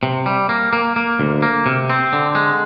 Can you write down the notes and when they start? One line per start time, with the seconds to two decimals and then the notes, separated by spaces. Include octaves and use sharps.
0.03 C3
0.26 G3
0.49 A#3
0.73 A#3
0.96 A#3
1.20 D2
1.42 A#3
1.66 C3
1.90 C4
2.13 D3
2.35 G#3